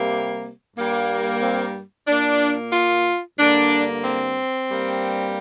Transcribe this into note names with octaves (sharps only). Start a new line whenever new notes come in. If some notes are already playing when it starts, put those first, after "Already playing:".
Already playing: C3 G3 A#3
G2 G3 A#3
C4
A#2 A#3 D4
F4
G2 D3 A#3 D4
C4
G2 G3 A#3